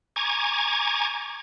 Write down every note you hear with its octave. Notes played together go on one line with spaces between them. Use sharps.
G#5 A#5 C#6 D6 G#6